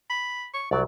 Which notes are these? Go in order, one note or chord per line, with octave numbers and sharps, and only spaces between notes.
B5
C#6
C2 F#3 D5